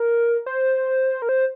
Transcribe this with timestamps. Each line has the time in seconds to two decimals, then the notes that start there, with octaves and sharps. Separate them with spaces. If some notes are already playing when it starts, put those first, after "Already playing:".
Already playing: A#4
0.46 C5
1.22 A#4
1.29 C5